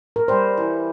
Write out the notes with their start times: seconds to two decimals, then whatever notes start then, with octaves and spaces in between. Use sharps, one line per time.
0.16 A#4
0.28 G3 C5
0.57 E3